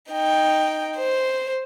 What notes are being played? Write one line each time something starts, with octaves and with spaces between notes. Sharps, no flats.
D#4 G5
C5